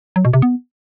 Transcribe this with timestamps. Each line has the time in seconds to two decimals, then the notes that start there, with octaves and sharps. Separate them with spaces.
0.16 F#3
0.25 B2
0.33 C3
0.42 B3